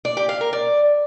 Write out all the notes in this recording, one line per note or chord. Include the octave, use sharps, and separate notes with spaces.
D5
G4
F5
A#4
D5